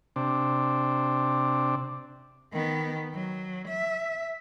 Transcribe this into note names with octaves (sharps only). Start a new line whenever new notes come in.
C3 D4
D#3 B3
F#3
E5